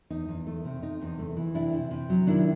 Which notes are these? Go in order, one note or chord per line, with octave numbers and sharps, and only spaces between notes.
E2 D#4
E2
A3
C3
C3 D#4
E2
A3
E3
C3 D4 E4
C3
C3
F#3
D#3 D4 E4